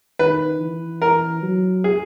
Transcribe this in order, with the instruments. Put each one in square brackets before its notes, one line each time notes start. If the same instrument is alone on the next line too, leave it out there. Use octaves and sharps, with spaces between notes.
[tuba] D#3 [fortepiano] B4
[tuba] E3
[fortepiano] A#4
[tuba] F#3
[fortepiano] G#4